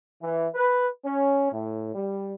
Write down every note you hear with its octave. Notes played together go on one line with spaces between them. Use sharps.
E3
B4
C#4
A2
G3